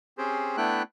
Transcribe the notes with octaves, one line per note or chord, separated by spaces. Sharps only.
C4 C#4 G4 G#4 C5
A3 B3 D4 E4 G5 F#6